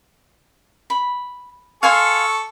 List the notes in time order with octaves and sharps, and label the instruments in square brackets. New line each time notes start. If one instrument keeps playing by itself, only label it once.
[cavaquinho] B5
[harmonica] A4 C#6 [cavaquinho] F5 G#5 C6